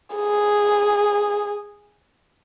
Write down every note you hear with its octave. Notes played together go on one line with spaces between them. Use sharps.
G#4